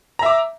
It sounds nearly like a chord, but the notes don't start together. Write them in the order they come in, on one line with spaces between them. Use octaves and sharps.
A#5 E5 D6